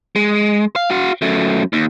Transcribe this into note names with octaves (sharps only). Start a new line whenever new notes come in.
G#3
F5
F#4 F5
F#2 A3
D#2